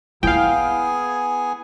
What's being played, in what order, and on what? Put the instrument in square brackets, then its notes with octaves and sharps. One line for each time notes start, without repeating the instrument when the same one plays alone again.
[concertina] B3 G#4 G#5 [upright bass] E4 [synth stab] F5 G5